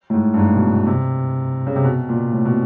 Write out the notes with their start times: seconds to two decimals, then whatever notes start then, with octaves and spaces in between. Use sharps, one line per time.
0.10 A2
0.14 G#2
0.34 G2
0.38 G#2
0.54 B2
0.71 B2
0.87 C3
1.67 C#3
1.76 C3
1.84 B2
2.09 A#2
2.33 A2
2.45 B2